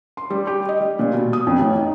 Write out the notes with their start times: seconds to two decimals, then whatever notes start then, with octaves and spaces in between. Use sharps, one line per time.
0.17 C6
0.30 G3
0.47 G4
0.69 D#5
0.80 G3
0.99 A#2
1.14 B2
1.33 D#6
1.47 F2
1.59 A1
1.79 D#4